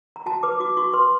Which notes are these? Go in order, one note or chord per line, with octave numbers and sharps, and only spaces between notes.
A#5
F#4 A5
B4 D6
F#4 D6
F#4 C#6
B4 C6